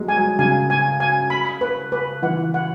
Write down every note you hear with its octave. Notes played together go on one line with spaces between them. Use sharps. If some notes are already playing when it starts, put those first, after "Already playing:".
Already playing: F#3 G#3
G#5
F#3
C#3 G#5
G#5
G#5
B5
B4
B4
E3 F#5
F#5